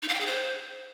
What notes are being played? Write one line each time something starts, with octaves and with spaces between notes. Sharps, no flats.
D#4
F5
G5
G#4
C5